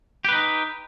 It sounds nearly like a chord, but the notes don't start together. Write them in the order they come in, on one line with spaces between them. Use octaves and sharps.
G4 B4 D#4